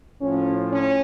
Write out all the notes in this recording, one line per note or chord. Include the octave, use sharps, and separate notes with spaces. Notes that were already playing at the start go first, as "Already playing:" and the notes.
A2 F3 C#4
C#4